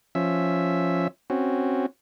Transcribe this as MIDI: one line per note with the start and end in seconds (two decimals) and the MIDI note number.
0.15 1.08 53
0.15 1.08 61
0.15 1.08 76
1.30 1.86 60
1.30 1.86 61
1.30 1.86 66